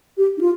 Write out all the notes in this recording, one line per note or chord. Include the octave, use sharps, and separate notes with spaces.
G4
D#4
F4